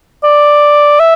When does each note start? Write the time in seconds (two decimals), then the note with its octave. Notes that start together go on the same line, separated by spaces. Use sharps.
0.24 D5
1.00 E5